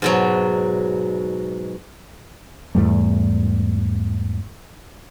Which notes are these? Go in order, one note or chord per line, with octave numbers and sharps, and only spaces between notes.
G#2 B2 F#3
E2 G#2 G3 A3